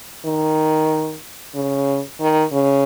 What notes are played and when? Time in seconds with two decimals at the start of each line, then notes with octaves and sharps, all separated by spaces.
0.25 D#3
1.55 C#3
2.20 D#3
2.52 C#3